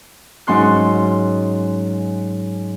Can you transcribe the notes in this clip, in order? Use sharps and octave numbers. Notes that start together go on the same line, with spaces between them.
G#2 F#3 C#4 C6 F#6